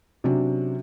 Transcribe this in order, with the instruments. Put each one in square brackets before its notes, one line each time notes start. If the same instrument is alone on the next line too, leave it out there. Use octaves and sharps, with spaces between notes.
[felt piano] C3 F#3 C#4 D4 F#4